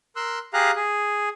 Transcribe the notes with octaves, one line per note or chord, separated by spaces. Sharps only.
A#4 C6 E6 F#6
G4 G#4 F5 A#5 F#6
G#4